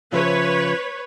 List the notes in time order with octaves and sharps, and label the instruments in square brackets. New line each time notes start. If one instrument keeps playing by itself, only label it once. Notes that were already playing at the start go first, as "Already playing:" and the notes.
[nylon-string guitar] C#3 F3 E5 [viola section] B4 C#5